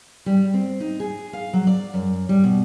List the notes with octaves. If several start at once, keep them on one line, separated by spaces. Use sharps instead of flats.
G3
C4
D#4
G#4
F5
F#3
D5
F#2
G3
B2